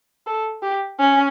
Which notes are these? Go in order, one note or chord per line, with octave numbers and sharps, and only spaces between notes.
A4
G4
C#4